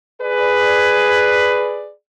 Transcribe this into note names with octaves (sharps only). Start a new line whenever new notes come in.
G#4 B4 D5